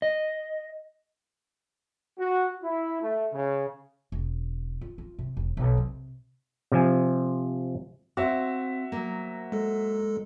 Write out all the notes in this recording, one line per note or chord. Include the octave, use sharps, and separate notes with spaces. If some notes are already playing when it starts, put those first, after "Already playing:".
D#5
F#4
E4
A3
C#3
E1
F4
F4
C3
E1
B1
C3
C3 F3 G#5
C4 F#4 C5 E5 F5
F#3 A#3
G#3 A4